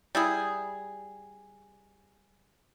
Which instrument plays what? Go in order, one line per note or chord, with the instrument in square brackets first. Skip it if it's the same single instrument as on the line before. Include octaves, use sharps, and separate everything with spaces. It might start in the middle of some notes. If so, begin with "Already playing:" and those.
[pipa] G3 E4 G#4